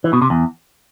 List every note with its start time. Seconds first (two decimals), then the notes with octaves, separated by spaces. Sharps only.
0.04 E3
0.13 B2
0.22 C3
0.30 E2